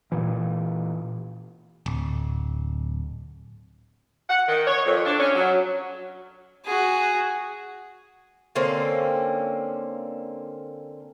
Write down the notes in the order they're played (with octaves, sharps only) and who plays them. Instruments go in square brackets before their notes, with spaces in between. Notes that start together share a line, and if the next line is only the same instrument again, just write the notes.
[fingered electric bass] A#2 E3
[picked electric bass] D1
[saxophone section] F#5
D#3
C#5
F2
D4
C#4
F#3
[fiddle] F#4 G#4
[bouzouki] D3 A#3 C4 C#4